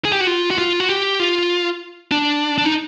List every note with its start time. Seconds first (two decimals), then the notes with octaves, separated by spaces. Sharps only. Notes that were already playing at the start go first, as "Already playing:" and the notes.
0.05 G#4
0.12 G4
0.21 F#4
0.27 F4
0.51 F#4
0.58 F4
0.80 F#4
0.89 G4
1.19 F4
2.11 D4
2.58 D4
2.66 D#4